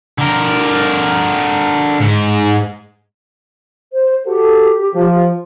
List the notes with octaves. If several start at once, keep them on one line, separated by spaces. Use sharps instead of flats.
D3 A#4
G#2
C5
F#4 G4 A4
F3